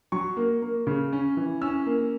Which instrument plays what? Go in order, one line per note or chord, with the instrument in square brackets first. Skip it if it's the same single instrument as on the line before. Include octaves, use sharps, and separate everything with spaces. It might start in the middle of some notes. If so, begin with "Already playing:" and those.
[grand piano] F#3 C#6
A#3
A#3
C#3
C#4
E3
C#4 E6
A#3